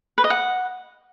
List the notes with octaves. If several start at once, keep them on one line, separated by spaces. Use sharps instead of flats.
B4
D#5
F#5